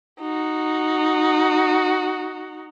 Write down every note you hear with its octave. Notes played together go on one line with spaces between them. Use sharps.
D#4 F#4